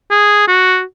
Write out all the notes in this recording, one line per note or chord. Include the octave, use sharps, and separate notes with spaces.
G#4
F#4